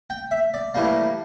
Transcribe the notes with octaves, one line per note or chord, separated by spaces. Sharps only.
G5
E5
D5
A2 E3 G3 A#3